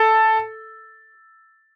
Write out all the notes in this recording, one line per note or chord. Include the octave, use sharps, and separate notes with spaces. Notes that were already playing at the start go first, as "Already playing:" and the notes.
Already playing: A4